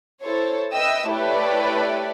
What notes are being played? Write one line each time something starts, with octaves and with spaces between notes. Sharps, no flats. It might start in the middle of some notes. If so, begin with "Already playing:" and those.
E4 A4 C5 C#5
B4 D#5 E5 G5 E6
A3 E4 G4 B4 C#5 D5